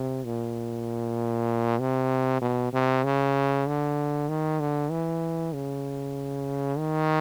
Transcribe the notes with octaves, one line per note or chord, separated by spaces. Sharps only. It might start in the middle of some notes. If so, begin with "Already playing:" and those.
Already playing: C3
A#2
C3
B2
C3
C#3
D3
D#3
D3
E3
C#3
D#3